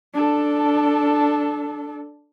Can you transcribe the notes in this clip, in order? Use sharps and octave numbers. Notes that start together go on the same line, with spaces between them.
D4 A4